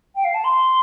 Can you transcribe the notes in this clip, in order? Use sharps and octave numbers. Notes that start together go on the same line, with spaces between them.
G5
F5
A5
C6